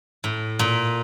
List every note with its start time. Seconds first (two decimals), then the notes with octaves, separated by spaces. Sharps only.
0.24 A2
0.59 A#2